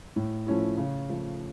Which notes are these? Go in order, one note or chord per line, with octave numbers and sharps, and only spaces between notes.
A2
F3 A3 C#4 E4
C#3
F3 A3